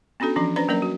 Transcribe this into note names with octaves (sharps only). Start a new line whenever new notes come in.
B3 C#4 D4 F#4 A4
E3 F3 C#4 D4
C#4 D4 B4 C5 D5 A#5
F#3 A#3 C#4 A#4 D5
F#4